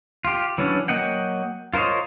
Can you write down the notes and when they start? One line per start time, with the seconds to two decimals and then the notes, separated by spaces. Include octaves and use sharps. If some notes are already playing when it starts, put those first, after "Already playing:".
0.25 F4 G4
0.58 E3 F#3 C#4 D4
0.88 F#3 A#3 D#5 F#5 G5
1.74 F4 A#4 C5 C#5 D#5